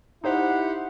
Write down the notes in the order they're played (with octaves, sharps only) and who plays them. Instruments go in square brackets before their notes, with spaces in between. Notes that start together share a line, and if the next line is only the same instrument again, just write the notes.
[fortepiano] D#4 C5 [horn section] E4 G4 F#5